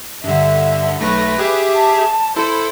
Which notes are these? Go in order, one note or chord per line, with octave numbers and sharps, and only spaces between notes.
G2 D3 E5
B1 A3 B4 A#6
G4 G#4 E5
A5
E4 A4 C5